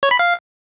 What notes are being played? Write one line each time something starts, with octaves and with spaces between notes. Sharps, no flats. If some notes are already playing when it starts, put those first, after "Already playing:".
C#5
B5
F5